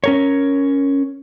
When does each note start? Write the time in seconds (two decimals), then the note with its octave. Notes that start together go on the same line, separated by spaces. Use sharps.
0.04 C#4 A#4 C#5